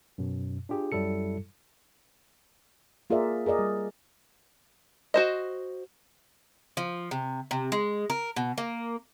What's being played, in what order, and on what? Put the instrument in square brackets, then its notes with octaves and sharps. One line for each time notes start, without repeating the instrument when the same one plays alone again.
[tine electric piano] F#2 B2
D4 F4 G4 G#4
F#2 F#3 G3 E4 A4 C#7
[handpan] A#3 F4 G#4 A#4 D5 E5
G#4 A#4 D5 D#5
G3
[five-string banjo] F#4 C5 D#5
[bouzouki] F3
C3
C3
G#3
A#4
B2
A#3